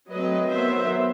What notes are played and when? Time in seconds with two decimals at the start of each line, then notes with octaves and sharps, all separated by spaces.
0.10 F#3 A3 C4 B4 D#5
0.49 D#3 F#3 B3 C5 E5